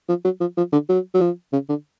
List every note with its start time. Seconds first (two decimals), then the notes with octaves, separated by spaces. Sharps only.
0.09 F3
0.24 F#3
0.40 F3
0.57 F3
0.72 D3
0.89 F#3
1.14 F#3
1.21 F3
1.53 C#3
1.69 D3